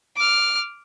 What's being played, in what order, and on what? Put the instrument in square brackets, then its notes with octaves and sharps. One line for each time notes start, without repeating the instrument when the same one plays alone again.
[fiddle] D6 F6